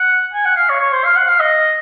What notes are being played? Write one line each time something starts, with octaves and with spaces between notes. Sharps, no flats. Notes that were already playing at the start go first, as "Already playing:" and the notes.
Already playing: F#5
G#5
F#5
F5
C#5
C#5
C5
F5
F#5
F5
D#5